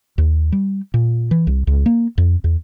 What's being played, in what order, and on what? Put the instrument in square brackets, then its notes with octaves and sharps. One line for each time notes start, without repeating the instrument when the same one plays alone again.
[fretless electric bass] D#2
G3
A#2
E3
C2
C#2
A#3
F2
E2